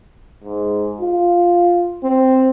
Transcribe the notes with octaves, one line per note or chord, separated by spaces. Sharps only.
G#2
F4
C4